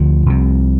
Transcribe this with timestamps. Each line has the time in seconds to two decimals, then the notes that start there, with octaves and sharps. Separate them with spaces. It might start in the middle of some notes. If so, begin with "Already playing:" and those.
Already playing: D2 D3 F3
0.26 C2 C3